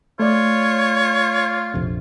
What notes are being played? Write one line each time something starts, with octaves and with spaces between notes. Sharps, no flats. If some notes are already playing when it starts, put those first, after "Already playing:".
A3 F4 C#5 D5
A#1 F2 C3